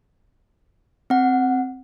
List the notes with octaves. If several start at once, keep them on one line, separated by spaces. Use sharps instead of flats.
C4 F#5